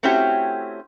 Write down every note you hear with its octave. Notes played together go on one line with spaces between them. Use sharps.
A3 C4 C#4 E4 F#4 G4